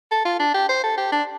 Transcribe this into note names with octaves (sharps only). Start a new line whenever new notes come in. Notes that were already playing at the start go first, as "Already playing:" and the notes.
A4
F4
D4
G4
C5
A4
G4
D4